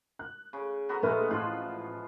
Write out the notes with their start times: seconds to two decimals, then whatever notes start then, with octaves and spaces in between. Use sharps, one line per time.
0.19 F#6
0.53 C#3
0.89 B3 F#4 A#4
1.02 A#1 G#3 A3 E4 B4 F6
1.30 A1 F3 F4 F#6